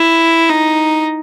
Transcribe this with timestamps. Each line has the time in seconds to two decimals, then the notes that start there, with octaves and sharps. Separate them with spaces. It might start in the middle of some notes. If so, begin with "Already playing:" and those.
Already playing: E4
0.49 D#4